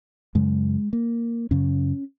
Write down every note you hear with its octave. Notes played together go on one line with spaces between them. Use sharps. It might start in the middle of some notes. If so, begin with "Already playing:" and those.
F#2 C#3 G#3
A#3
F#2 C#3 C#4